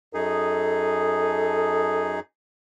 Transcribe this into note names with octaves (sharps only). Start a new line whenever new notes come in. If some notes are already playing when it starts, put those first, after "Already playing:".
F#2 D#4 G#4 A4